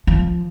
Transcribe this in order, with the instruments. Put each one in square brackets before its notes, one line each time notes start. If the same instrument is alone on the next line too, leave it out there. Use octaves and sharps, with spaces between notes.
[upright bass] F3